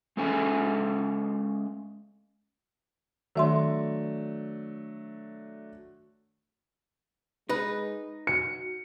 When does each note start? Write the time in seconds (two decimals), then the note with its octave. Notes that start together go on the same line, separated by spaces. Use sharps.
0.17 G#3 C#4 A4 E5 G5 G#5
3.36 D#3 F#3 A3 D4 E5 C6
7.49 G#3 D#4 B4
8.27 F#4 C#7